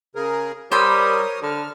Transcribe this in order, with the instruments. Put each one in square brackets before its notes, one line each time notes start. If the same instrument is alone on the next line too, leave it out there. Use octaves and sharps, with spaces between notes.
[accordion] C#3 G#4 A#4
[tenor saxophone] G3 [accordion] A#4 C#5 D#6 [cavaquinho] C5 B5
[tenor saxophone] D3 [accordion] F6